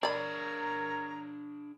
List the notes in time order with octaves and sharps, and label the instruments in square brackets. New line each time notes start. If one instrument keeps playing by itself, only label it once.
[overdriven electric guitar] D4 G#4 [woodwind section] A#4 C#5 A#5 [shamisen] D5 B5